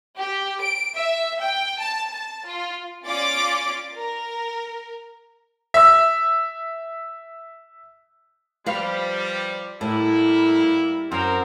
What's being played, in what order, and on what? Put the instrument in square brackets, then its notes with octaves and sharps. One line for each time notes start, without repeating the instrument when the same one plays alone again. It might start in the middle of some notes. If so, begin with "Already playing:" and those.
[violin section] G4
D7
E5
G5
A5
A5
F4
C#4 F4 D5 D6 A6 D7
A#4
[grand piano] E5 E6
[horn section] F3 G3 [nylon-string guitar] B4 F5
[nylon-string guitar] A2 [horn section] G3 A#3 E4
[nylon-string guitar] F#2 [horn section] C4 A#4 C5